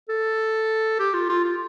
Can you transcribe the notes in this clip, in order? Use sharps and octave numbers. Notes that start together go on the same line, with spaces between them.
A4
G4
F4
F4
F4